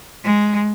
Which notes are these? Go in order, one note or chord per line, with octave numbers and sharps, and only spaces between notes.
G#3